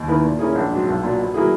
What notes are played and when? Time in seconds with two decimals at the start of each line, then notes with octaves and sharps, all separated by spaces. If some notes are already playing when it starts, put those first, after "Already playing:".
Already playing: D#2
0.08 D#3 A#3 E4 B4
0.24 A#2
0.39 A#3 C#4 E4 G#4
0.55 A#1
0.71 G#2 F#3
0.87 B1
1.03 A#2 F#3
1.19 B2
1.34 F#3 A#3 E4 G#4